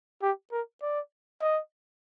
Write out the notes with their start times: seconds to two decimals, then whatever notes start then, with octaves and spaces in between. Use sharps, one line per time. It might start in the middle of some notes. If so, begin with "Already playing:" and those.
0.22 G4
0.52 A#4
0.82 D5
1.41 D#5